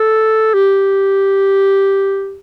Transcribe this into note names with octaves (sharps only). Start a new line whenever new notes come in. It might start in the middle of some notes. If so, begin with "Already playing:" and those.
Already playing: A4
G4